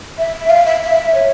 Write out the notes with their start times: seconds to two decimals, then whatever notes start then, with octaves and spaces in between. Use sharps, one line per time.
0.18 E5
0.50 F5
0.66 E5
0.82 E5
1.15 C#5